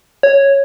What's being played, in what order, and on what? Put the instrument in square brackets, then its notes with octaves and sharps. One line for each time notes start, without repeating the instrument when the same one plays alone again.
[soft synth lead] C#5